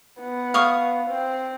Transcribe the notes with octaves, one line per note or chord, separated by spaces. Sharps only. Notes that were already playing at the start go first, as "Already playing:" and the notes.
B3
F5 C#6 D#6
C4